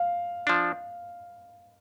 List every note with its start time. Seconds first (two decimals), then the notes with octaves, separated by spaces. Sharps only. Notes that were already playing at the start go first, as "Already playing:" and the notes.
Already playing: F5
0.47 F3 D4